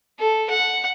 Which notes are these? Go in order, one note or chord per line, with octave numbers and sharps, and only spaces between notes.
A4
F#5